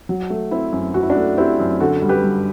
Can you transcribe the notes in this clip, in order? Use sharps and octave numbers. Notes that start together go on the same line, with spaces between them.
F#3
A3
C4 E4
F#2
F#3 F#4
E4
D4 F#4
A3
C4 E4 G4
F#2
D3 F#4 A4
G3
G4 B4
G2